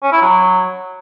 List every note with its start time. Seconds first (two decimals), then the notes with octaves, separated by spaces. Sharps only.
0.03 C#4
0.12 E4
0.21 F#3